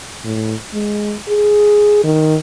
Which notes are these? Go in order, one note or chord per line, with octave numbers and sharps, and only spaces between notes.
A2
G#3
G#4
D#3